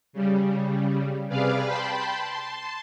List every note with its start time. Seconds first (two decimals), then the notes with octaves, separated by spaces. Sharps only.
0.13 C#3 G3
1.29 C3 G#4 B4 D5 F5 F6
1.66 G5 A5 B5 C6 G6
2.24 A5 C6